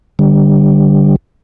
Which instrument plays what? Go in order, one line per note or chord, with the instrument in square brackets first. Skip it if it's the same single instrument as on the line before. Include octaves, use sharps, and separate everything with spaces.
[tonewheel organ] D3 G3